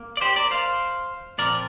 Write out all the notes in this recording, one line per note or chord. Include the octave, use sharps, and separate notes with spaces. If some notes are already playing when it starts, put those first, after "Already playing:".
Already playing: A#3
D5
G4 C5
A#4 D5
C5 F5
A#2 F3 C4 A#4 D5